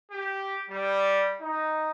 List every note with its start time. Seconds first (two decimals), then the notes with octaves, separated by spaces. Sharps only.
0.12 G4
0.69 G3
1.41 D#4